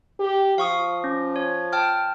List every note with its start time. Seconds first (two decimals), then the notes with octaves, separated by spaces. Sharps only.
0.20 G4
0.58 F3 F5 C#6 D#6
1.04 C#4
1.36 C#5
1.73 G5 A5 F6